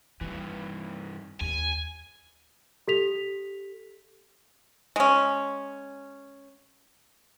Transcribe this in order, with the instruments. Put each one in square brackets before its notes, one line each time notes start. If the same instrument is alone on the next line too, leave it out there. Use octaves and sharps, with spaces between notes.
[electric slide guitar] G2 E3 [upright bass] D#3
[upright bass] D#2 [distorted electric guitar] G#5
[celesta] G4 A4 B6 F7
[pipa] G#3 C#4